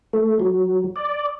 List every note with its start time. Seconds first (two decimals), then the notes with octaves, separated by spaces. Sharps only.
0.13 A3
0.40 F#3
0.96 D5